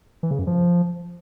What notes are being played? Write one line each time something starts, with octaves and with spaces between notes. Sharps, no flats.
E3
C#3
F#2
F3